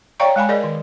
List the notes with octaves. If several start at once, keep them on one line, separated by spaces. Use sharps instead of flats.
C#5 D5 F5 G5 A#5 C#6
G#3 F5 G#5 B5
G#4 A#4 D5 D#5
D#3